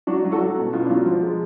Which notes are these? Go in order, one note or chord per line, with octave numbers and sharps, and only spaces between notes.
F#3 D4 F#4
F#3
F#4 A4
F#3
B2
B2 F4
D4
F#3 F4
F3
G#3